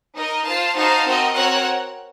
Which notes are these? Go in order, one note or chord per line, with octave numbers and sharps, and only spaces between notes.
D#4 A#4 D#5
F4 C5 F5 A5
D#4 F#4 C5 F5 A5
C4 F#4 A#4 D#5
C4 F#4 A#4 C#5 F#5